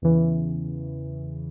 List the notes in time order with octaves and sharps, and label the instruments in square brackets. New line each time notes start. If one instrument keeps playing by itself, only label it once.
[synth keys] E2 C#3 E3